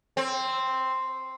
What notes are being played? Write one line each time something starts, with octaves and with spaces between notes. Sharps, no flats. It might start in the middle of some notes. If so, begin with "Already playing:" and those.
C4